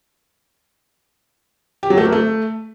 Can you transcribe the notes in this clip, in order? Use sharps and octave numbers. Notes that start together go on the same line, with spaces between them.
G4
F#3
A3
A#3
A3